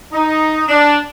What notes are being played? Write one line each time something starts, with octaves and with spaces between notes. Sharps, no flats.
D#4
D4